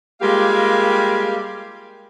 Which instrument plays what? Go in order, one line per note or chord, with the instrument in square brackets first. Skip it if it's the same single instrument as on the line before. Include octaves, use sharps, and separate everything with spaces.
[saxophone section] G3 G#3 A#3 F4 G4 F5